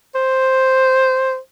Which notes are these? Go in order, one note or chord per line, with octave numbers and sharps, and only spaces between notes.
C5